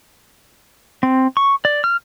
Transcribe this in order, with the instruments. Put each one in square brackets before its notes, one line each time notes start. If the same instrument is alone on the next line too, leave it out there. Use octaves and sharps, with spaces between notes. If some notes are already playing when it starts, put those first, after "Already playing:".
[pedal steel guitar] C4
C#6
D5
F6